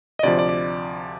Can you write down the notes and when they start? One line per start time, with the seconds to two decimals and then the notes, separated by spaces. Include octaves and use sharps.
0.19 D#5
0.23 D2 C3 F3 D5
0.39 D5
0.49 D5